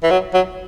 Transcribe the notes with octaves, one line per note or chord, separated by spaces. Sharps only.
E3
F#3
F#3